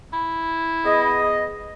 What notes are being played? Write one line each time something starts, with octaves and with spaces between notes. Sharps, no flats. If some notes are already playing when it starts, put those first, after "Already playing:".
E4
B3 G#4 D#5